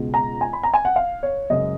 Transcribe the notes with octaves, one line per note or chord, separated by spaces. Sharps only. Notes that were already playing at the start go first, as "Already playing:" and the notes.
Already playing: C#2 B2 G#3
A#5
G#5
B5
A#5
G#5
F#5
F5
C#5
F#1 F#2 C#3 G#3 D#5